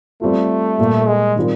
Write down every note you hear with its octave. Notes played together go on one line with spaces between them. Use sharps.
G3 A3 C4 F4
A#2 G3 A#3
G#3
D#3 G3 C4 F4 A#4